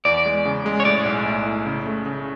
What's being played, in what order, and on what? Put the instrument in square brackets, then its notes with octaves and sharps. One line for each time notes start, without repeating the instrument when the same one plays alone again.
[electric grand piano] E2 [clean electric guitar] D5
[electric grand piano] G#3
C#3
G#3
[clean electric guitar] C#5
[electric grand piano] A2 [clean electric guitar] D5
[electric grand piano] B1
A2
A2
C#3
A3
C#3